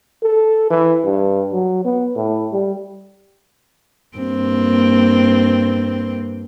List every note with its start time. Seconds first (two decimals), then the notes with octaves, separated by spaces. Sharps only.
0.23 A4
0.70 E3
1.05 G2
1.52 F#3
1.85 B3
2.16 A2
2.52 G3
4.17 G2 A#3 C4